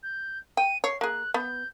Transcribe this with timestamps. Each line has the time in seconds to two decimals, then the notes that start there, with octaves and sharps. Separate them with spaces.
0.03 G6
0.57 G5 D#7
0.84 C#5 C7
1.01 A#3 G#4 F#6
1.34 B3 G6